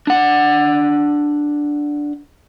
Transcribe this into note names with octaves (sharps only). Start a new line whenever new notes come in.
D4 F#5